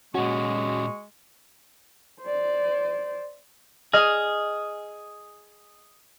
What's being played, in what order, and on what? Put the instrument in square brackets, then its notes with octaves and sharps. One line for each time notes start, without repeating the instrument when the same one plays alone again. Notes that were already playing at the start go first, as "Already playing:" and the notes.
[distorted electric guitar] A#2 C#4 [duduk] G#3 [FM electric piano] F#4 [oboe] C#6
[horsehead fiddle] C5 D5
[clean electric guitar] G#4 [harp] D#5 F6